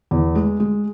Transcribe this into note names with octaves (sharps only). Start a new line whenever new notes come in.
E2
G#3
G#3